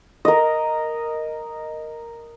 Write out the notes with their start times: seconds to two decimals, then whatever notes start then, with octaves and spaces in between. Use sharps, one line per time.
0.25 A#4 D#5